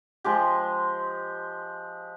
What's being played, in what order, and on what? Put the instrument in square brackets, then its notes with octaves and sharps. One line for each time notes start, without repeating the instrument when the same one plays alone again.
[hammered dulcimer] F3 G#3 G4